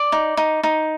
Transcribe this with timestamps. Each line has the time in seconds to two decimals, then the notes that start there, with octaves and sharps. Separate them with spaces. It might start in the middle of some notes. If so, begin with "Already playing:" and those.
Already playing: D5 D6
0.12 D#4
0.37 D#4
0.63 D#4